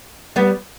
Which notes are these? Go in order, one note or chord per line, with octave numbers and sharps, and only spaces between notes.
G3 B3